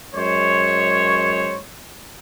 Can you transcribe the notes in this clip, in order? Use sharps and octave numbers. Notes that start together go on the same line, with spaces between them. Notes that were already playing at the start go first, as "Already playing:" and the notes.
F#2 G#3 C5 C#5